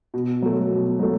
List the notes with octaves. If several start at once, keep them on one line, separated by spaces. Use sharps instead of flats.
B2
F#3 A3
B2
F#3 A3